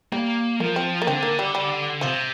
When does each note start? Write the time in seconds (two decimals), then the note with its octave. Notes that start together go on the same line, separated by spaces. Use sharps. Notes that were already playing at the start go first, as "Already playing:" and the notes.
0.12 G3 A#3
0.60 F3 A#3
0.76 C4
1.02 A#3
1.07 D3 C4
1.23 A#3
1.39 G3
1.55 G3
2.01 C3 F3